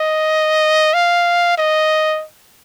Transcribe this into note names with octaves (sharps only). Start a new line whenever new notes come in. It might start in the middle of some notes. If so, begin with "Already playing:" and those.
Already playing: D#5
F5
D#5